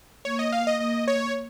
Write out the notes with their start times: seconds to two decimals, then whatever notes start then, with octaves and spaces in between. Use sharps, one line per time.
0.25 A#3 C#5
0.39 D#5
0.52 F5
0.67 D#5
0.80 A#3 D#5
1.08 C#5